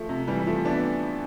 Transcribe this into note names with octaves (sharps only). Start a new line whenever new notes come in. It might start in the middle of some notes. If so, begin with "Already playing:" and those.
Already playing: F3 A3
C3
E3 G3
F3 A3
B3 D4